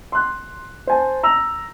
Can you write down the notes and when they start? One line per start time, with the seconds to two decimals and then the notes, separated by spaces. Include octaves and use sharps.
0.12 C6 F#6
0.87 C5 G#5 A5
1.23 A#5 E6 F7